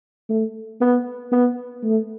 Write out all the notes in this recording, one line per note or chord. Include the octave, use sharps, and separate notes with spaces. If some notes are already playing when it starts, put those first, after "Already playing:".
A3
B3
B3
A3